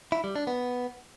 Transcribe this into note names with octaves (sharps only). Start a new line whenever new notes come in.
E4
G3
D4
B3